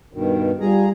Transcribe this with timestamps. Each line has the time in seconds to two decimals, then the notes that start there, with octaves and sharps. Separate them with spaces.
0.13 G2 B2 D#3
0.60 G3 F4 G#4 A#5